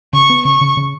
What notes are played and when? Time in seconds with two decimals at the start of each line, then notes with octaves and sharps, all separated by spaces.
0.13 C#3 C#6
0.30 B3
0.45 C#3 C#6
0.61 C#3
0.77 C#3